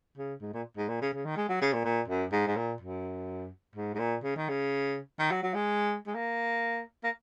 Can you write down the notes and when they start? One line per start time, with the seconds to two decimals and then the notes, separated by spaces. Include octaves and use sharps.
0.18 C#3
0.41 G#2
0.53 A#2
0.77 G#2
0.89 A#2
1.01 C#3
1.13 C#3
1.25 D#3
1.36 G#3
1.49 F#3
1.61 C#3
1.73 A#2
1.85 A#2
2.08 F#2
2.32 G#2
2.47 G#2
2.56 A#2
2.81 F#2
3.75 G#2
3.95 G#2
3.99 A#2
4.23 C#3
4.36 D#3
4.49 C#3
5.19 D#3
5.31 F#3
5.43 F#3
5.54 G#3
6.06 G#3
6.15 A#3
7.03 A#3